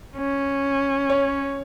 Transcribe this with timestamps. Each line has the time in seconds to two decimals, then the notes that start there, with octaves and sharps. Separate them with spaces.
0.17 C#4
1.10 C#5